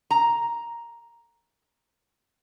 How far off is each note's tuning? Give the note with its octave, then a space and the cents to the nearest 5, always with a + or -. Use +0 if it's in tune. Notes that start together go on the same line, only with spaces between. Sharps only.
A#5 +5